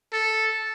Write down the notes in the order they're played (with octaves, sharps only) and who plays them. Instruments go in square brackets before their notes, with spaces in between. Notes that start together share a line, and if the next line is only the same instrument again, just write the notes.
[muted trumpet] A4